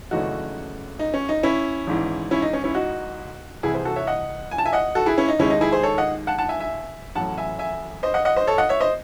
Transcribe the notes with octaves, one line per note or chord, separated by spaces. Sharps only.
G#1 F#2 C#3 E3 A3 D#4 F#4
D#4
C#4
D#4
C#4 E4
G#1 G#2 E3
C#4 E4
D#4
C#4
C#4 E4
D#4 F#4
C2 C3 E3 E4 G#4
G#4 C5
F#4 A4
C#5 E5
D#5 F#5
G#5
A5
E5 G#5
D#5 F#5
F#4 A4
E4 G#4
C#4 E4
D#4
D#2 D#3 G#3 C#4 E4
D#4
E4 G#4
G#4 C5
A4 C#5
D#5 F#5
F#5 A5
F#5 A5
E5 G#5
E5 G#5
A1 A2 F#3 F#5 A5
E5 G#5
E5 G#5
C5 D#5
D#5 F#5
D#5 F#5
C5 D#5
A4 C#5
D#5 F#5
C#5 E5
C5 D#5